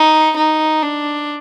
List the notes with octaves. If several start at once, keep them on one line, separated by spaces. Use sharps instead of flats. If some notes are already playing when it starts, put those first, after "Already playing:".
Already playing: D#4
D#4
D4